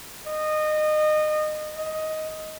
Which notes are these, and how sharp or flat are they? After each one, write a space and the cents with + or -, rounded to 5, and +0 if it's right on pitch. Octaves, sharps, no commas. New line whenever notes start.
D#5 -25
D#5 +10